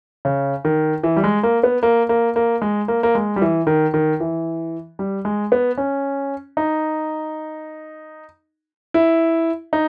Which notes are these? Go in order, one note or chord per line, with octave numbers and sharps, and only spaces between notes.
C#3
D#3
E3
G3
G#3
A#3
B3
A#3
A#3
A#3
G#3
A#3
A#3
G#3
G3
E3
D#3
D#3
E3
G3
G#3
B3
C#4
D#4
E4
D#4